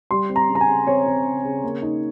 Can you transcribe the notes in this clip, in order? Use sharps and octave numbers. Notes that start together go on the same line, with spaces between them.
G3 C6
C4
A#5
C#3
A#5
G#5
C#3
C4 C#5
C4
C#3
C#3
A#3
D#4